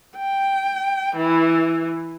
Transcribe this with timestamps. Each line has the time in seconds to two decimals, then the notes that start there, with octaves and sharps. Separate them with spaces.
0.17 G5
1.16 E3